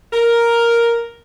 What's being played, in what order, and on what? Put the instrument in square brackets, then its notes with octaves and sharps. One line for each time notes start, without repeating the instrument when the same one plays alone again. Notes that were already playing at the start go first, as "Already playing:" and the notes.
[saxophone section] A#4